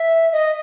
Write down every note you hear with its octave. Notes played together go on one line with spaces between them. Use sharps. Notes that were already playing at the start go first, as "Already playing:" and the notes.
Already playing: E5
D#5